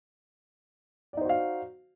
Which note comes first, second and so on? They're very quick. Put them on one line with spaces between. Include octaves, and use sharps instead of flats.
D5 D#4 C5 F#4 F5